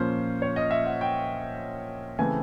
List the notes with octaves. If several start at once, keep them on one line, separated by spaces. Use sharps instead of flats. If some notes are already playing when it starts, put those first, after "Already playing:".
Already playing: A#2 F3 A#3 C#4 C5
C#5
D#5
E5
F#5
G5
C#3 E3 A3 C4 G#5